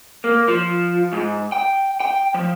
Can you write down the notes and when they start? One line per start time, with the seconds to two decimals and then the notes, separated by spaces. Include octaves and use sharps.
0.24 A#3
0.48 F3
1.13 G#2
1.52 G5
2.00 G5
2.34 F3